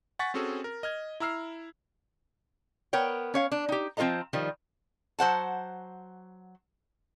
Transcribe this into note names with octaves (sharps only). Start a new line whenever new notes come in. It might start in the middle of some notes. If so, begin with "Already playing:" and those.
F#5 G#5 C#6 A6 B6
C4 C#4 F#4 G#4 A4
A#4
D#5 F6 G#6
E4 A#5 E6 F6 C7
B3 A#4 C#5 G5
C#4 C#5 F5
D4
D#4 G4
F3 C4 F4 A4 D#5 A#5
D#3 F3 G3
F#3 C5 F#5 A5